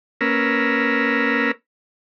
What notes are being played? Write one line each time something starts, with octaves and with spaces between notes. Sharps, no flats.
A#3 C#4 A#4 B4 E6